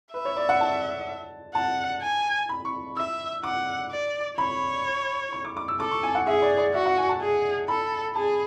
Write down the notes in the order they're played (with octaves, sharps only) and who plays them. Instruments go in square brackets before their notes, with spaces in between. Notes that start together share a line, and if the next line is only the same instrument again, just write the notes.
[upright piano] B4 [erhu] E5
[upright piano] C#5
D5
F#5
A5
[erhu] F#5 [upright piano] A5
[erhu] G#5
[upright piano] B5
C#6
[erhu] E5 [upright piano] E6
[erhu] F#5 [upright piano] D6
[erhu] D5
[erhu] C#5 [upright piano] B5
[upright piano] C#6
D6
D6
E6
[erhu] A4 [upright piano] D6
[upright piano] C#6
G#5
F#5
[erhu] G#4 [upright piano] E5
[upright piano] D5
D5
[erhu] F#4 [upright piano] E5
[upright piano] F#5
G#5
A5
[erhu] G#4
[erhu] A4 [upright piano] B5
[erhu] G#4 [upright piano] A5